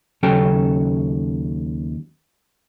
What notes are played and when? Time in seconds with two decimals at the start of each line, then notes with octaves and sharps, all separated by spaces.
0.23 D#2 C#3 F#3 C#4 A4 G5